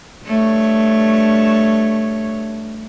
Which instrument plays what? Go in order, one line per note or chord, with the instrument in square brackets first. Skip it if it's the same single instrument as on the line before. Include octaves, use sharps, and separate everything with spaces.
[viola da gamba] G2 A3 C#5